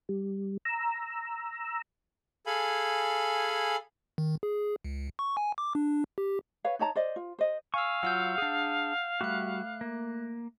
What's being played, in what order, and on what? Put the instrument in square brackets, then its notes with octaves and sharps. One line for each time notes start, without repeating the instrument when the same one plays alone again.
[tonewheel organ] G3
A#5 E6
[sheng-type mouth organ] G#4 A4 F5 G#5 B5
[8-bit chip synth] D#3
G#4
C#2
C#6
G#5
D6
D4
G4
[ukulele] B4 C#5 F5
D#4 C#5 A5 A#5
C5 D5 D#5
F4
C5 D#5
[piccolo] F5 [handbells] G#5 E6 [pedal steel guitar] C#6
[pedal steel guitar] F#3 F4 [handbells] F#5 E6 G6
[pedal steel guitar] D4 G#4
[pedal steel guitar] G3 F#4 [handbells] A3 F#6
[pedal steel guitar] A#3